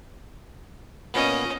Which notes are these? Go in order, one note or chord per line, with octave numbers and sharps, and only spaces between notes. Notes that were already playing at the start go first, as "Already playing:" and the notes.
A#2 B3 C#4 D#5